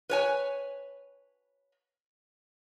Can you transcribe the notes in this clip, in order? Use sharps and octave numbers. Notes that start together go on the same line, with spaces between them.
B4 C#5 G#5